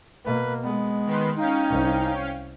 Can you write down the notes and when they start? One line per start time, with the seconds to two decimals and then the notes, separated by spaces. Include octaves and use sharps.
0.25 B2 A#3 B4
0.63 G#3 B3
1.06 D#3 B4 C6
1.36 C#4 D#4 F5 G5
1.69 C2